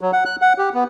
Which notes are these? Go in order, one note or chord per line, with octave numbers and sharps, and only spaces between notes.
F#3
F#5
F#6
F#5
G4
B3